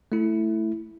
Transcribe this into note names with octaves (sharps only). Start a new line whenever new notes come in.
A3 E4